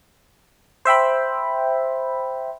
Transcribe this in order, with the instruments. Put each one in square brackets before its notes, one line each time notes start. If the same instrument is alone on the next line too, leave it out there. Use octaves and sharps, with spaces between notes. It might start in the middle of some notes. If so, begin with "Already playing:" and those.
[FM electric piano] C5 E5 G5 B5